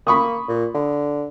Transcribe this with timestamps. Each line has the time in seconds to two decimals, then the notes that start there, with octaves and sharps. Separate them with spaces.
0.07 A#3 B5 C#6 D#6
0.48 A#2
0.74 D3